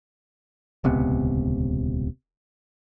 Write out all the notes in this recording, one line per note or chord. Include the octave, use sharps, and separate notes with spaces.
D#1 C#2 C3 B3